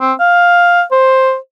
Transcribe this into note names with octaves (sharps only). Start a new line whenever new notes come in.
C4
F5
C5